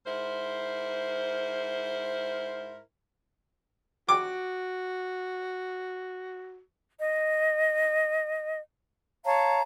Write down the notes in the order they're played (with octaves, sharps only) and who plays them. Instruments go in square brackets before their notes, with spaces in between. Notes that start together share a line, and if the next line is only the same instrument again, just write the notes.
[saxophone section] G#2 E4 A#4 C5
[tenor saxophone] F#4 [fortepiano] D6
[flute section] D#5
C#5 F5 A5 A#5